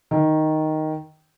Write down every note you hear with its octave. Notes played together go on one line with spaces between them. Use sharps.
D#3